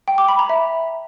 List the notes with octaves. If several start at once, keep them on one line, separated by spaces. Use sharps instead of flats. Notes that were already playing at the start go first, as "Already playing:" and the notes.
G5
D6
B5
A#5
E5